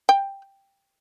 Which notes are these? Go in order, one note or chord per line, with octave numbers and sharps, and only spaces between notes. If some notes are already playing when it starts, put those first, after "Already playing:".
G5